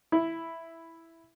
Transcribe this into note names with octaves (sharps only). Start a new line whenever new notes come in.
E4